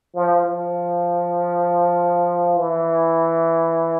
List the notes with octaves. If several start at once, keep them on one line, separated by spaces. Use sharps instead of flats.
F3
F3
E3